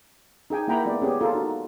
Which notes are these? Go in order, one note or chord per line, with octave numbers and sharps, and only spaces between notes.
D#4 G#4 G5 G#5
A#3 E4 F#5 G5 A#5 B5
G#3 B3 F4 D5
B3 C#4 G4 G#4
F4 A4 A#4
D#4 F#4